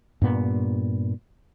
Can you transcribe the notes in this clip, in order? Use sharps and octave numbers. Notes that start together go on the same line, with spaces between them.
G2 A#2 B3